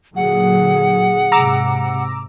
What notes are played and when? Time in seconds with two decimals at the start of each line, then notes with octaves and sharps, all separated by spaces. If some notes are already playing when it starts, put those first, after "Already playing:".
0.16 A#2 D3 F#3 G#4 F#5
1.32 G#2 C3 A#5 D6 E6